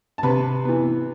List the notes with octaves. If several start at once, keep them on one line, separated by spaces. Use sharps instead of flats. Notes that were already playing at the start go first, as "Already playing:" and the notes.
A5
C3 B4 B5
E3 B3